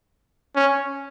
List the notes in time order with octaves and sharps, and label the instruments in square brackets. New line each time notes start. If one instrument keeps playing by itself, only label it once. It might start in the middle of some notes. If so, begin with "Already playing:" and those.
[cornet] C#4